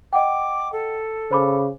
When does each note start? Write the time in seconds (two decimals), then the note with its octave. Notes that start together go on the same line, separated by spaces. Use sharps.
0.13 D#5 F#5 G5 D6
0.72 A4
1.31 C#3 C5 B5 D6